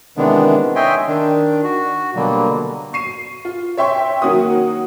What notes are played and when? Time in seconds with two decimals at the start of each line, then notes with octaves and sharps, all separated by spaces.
0.17 C3 D#3 E3 G#3 B3 D4
0.76 C#5 D#5 E5 G5 G#5 C6
1.07 D#3 D4
1.64 F#4
2.15 B2 D3 F#3 G3 A#3
2.93 C#6 C7 D#7
3.45 F4
3.77 C#5 E5 G5 C6 C#6
4.22 D#3 F#3 A#3 F#4 C#5 D#6